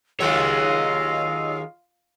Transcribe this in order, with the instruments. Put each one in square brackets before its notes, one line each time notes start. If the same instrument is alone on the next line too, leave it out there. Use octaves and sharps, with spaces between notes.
[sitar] D#2 F#3 G#3 [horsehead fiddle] F4 F5 [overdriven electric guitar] C#5 D#5 [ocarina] E6